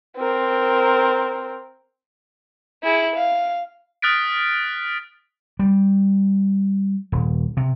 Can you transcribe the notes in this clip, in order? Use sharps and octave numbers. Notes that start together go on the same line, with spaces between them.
C4 A#4
E4 G#4
F5
D#6 F6 F#6 A6 B6 D7
G3
D#1
C3